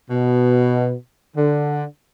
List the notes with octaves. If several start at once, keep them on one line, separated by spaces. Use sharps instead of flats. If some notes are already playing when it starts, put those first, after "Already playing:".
B2
D3